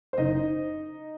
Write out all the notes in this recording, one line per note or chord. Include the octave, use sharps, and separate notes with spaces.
C5
F#1 D#4 D#5